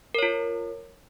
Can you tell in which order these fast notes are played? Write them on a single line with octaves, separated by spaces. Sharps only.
A#4 C#5 F4